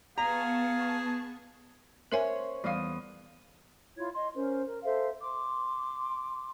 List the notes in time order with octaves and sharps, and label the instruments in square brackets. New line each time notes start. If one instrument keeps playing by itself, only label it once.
[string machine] B3 A5 C#6 [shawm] G#4 [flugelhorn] F5 [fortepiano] A#5
[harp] C#4 C5 C#5 [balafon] A#4 E5 G#5
[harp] E2 D#6 [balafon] G3 F5
[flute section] E4 F4 C#5 G#6
D#5 C6
C#4 A#4 C5
A#4
A4 C5 E5 F5
C6 D6